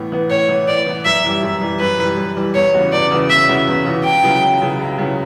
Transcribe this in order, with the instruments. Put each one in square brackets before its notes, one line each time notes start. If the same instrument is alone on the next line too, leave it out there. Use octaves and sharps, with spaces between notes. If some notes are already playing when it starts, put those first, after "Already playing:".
Already playing: [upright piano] A2 E3 B3
E3 B3
[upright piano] A2 [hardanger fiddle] C#5
[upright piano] E3 B3
[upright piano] A2 [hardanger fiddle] D5
[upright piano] E3 B3
[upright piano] F#2 [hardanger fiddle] E5
[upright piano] E3 G3
F#2
E3 G3
[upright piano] F#2 [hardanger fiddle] B4
[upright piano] E3 G3
F#2
E3 G3
[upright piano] E2 [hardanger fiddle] C#5
[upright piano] C#3 E3 B3 F#4
[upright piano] E2 [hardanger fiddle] D5
[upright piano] C#3 E3 B3 F#4
[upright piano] E2 [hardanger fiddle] E5
[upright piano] C#3 E3 B3 F#4
E2
C#3 E3 B3 F#4
[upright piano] C#2 [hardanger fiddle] G5
[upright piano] C#3 F#3 B3 E4
C#2
C#3 F#3 B3 E4
C#2
C#3 F#3 B3 E4